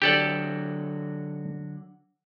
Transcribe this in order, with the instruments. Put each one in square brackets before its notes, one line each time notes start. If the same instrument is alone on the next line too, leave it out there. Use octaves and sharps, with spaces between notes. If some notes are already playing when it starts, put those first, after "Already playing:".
[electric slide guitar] D3 F#3 [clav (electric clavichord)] G4 A4 D5